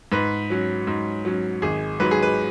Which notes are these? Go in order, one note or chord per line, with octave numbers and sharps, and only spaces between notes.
G#2 B4
F#3 C#4
G#2
F#3 C#4
G#1 G#4
G#2 F#3 B4
G#4
B4